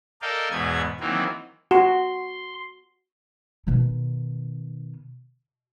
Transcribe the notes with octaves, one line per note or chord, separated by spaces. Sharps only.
A4 A#4 D5 D#5 F5 G5
E2 G#2 B2 B3 G#6
D#3 E3 F#3 A#3 C4
F#4 C6
B2 D#3